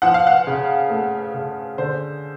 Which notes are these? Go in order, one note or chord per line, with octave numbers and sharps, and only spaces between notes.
F3 F#5
F5
F#5
C#3
A3
C#3
D3 C5